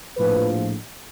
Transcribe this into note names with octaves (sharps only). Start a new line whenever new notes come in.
A#1 A2 F3 B4